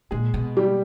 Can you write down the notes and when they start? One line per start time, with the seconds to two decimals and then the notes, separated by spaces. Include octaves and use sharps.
0.11 A#2 G#3 G#4
0.34 B2
0.57 G3 G4